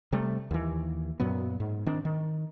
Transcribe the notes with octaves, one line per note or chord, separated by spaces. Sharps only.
C3 G3 A3
D#2 E3
F#2 A#2 F#3 B3
G#2
D#3 C4 D4
D#3